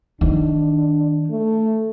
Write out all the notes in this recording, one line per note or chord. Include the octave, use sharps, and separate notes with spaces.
D#3 D4
A3